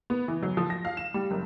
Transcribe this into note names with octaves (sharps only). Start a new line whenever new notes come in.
B3
E3
F#3
F3
A#6
F5
E7
G3
F#1